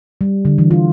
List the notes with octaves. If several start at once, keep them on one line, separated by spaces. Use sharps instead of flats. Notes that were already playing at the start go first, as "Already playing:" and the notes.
G3
D3
E3
F4